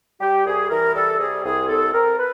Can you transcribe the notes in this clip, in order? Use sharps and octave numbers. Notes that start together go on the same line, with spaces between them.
G3 G4
C2 G#4
E3 A#4
G3 A4
C3 G#4
C2 G#4
C4 A4
C4 A#4
B4